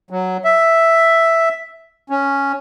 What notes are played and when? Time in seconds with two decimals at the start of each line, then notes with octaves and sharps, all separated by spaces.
0.10 F#3
0.45 E5
2.10 C#4